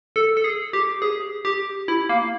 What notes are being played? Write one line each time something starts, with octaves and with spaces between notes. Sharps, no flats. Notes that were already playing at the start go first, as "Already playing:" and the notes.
A4
A4
G#4
G4
G#4
G4
E4
A#3